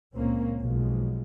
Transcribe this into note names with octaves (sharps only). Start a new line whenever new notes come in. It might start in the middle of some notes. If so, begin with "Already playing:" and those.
C#2 A#2 A#3 C4 C#4
B1 F3 G#3